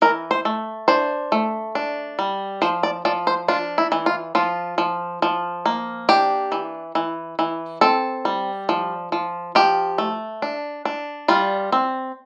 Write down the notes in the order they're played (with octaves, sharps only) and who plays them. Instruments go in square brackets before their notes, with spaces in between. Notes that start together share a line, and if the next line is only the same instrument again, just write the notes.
[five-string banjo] E3 A#4
C5
A3
D4 C5
A3
D4
G3
F3 C5
D5
F3 D5
C5
D4 F4
E4
E3
F4
F3 F4
F3
F3
A#3
D4 G4
E3
E3
E3
C4 A4
G3
F3
F3
F3 G4
A3
D4
D4
G3 F4
C4